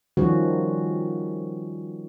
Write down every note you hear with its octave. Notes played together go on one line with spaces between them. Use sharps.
D#3 F3 G3 C#4 F#4